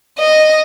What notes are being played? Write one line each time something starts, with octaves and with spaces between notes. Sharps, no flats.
D#5